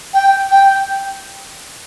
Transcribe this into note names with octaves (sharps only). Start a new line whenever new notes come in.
G5
G5